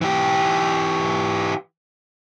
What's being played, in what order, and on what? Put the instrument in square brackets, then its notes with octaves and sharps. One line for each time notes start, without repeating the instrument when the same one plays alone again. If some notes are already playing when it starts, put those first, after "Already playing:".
[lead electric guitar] E3 G4